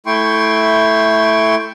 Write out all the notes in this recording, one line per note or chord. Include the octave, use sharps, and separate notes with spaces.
A3 E4 G5 C6 C#6